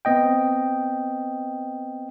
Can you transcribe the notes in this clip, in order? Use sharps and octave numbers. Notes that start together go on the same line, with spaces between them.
B3 C4 D#5 G5